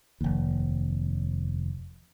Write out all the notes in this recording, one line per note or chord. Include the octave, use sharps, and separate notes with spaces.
F1 D#2